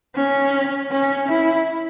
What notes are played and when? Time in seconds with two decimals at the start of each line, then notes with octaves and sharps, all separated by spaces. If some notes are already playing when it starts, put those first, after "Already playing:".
0.15 C#4
0.91 C#4
1.28 E4